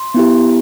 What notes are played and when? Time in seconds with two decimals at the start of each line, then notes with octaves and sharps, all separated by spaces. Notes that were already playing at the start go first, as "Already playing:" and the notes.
Already playing: C6
0.14 B3 E4 G4